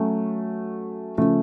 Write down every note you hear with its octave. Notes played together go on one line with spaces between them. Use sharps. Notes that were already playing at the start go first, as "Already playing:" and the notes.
Already playing: F#3 A3 C#4 F#4
C#3 F3 A3